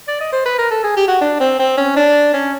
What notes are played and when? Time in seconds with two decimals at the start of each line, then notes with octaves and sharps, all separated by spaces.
0.08 D5
0.20 D#5
0.33 C5
0.46 B4
0.58 A#4
0.71 A4
0.84 G#4
0.97 G4
1.08 F#4
1.21 D4
1.40 C4
1.59 C4
1.77 C#4
1.96 D4
2.34 C#4